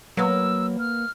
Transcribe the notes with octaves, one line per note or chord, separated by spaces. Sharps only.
F#3 A#3 B3 E6
F6